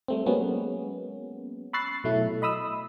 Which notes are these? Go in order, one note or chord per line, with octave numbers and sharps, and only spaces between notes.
G3 A3 C4
F#3 G#3 A#3 B3 C#4
B5 C#6 E6 F#6 A6 C7
B2 F#3 A3 E4
D#5 B5 D#6 E6